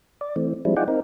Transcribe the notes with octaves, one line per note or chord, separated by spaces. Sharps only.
D5
E3 A3 C4
F3 G3 G#3 C4 D4 E4
D#4 F4 G#4 D5 F#5 G5
C4 D#4 A#4